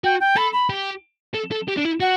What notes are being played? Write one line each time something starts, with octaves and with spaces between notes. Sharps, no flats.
F#4 G5
G5
A4 B5
B5
G4
A4
A4
G4
D4
E4
F#4 F#5